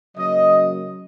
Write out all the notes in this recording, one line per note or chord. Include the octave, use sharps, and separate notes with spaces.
C#3 F#3 A#3 D#5